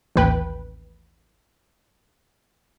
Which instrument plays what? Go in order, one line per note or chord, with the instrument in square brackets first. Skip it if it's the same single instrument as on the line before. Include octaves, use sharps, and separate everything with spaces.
[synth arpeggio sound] A1 D#2 B4 G5